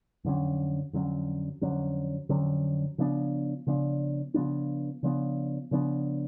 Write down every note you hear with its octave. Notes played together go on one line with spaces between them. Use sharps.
F2 D3 F#3 C#4
F2 D3 F#3 C#4
F2 D3 F#3 C#4
F2 D3 F#3 C#4
C#3 F3 B3 D4
C#3 F3 B3 D4
C#3 F3 B3 D4
C#3 F3 B3 D4
C#3 F3 B3 D4